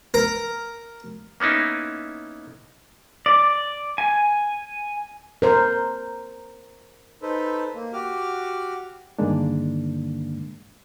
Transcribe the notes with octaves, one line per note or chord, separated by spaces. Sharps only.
A#4
A#3 B3 C#4 D#4 E4
D5
G#5
A#4 C5
D#4 A4 B4 C5
A#3
F#4 G4 D6 F6
G2 D3 D#3 G#3 A#3 D4